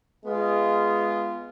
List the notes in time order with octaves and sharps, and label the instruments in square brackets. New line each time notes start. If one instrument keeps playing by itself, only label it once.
[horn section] G#3 B3 F4